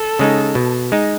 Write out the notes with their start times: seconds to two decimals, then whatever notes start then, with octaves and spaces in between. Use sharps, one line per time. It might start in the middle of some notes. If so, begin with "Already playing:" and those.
Already playing: A4
0.19 C#3 G#3 D#4
0.55 B2
0.92 G#3 D#4